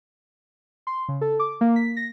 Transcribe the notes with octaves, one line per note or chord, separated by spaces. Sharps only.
C6
C#3
A4
D6
A#3
B6
A#6